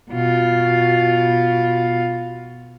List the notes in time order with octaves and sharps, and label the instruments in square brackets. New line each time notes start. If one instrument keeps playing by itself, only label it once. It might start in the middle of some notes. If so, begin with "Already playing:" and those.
[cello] B2 F4